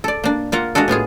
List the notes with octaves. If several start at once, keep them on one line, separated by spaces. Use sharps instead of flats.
A4 D5
A#3 D4
A#3 F4 A#4 F#5
G#3 A#3 D4 F#4 A4
A2 B3 F4 G#4